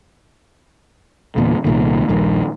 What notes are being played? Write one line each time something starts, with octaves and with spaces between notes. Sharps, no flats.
E2 A#2 D3
C2 A#2 D#3
D#1 A#1 G2 D#3